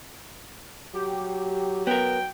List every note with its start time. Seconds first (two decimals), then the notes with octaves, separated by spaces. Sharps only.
0.94 F#3 G4
1.87 B3 A#4 G5